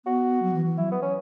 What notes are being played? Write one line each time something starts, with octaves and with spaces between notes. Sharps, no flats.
B3 F#4
F#3
E3
E3
F#3 E4
B3
C#4